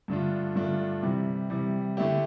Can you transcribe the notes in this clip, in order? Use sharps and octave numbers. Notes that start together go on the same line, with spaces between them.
G2 D3 A3 D4 F4
G2 D3 A3 D4 F4
C3 E3 G3
C3 E3 G3
D3 A3 E4 G4